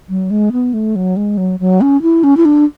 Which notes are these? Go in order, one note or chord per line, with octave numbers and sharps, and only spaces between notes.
F#3
G#3
B3
A3
F#3
G#3
F#3
F#3
C#4
E4
C#4
E4
D4